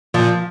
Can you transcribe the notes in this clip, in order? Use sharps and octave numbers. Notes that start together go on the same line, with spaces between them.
A#2 F3